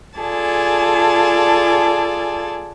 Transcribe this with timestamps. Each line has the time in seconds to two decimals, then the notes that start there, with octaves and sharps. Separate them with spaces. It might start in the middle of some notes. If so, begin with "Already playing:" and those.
0.19 F4 G#4 A4 D5 G#5 A5